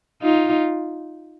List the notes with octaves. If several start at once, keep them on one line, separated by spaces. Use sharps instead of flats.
D#4 F4